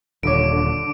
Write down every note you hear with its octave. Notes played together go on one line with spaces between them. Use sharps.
D#1 D3 B4 C#5 D6 D7